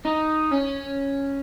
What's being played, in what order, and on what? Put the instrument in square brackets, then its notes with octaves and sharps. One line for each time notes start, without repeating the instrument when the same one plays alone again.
[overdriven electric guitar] D#4
C#4